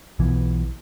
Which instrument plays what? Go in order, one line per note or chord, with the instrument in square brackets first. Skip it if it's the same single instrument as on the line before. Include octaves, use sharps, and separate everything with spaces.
[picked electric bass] B1 B2 E3